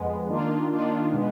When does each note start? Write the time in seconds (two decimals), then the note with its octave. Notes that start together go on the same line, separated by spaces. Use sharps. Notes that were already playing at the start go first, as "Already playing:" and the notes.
Already playing: F2 G#3 B3
0.28 D#3 A#3 D4 F4
0.70 D#3 A#3 D4 F4
1.12 B2 G#3 B3